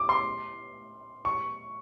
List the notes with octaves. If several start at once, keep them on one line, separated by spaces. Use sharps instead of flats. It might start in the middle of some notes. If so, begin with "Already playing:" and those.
Already playing: D6
C6
C#6